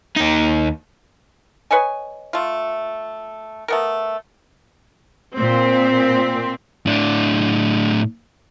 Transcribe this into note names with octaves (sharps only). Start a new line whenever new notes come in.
D#2 D#4
B4 C#5 D#5 G#5
A3 F4
A3 B3 A#4
A#2 C4
A2 D4